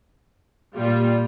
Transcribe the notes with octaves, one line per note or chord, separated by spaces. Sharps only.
A#2 G3 F4